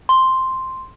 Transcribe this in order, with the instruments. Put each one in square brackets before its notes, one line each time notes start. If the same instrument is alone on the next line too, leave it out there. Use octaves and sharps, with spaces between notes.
[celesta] C6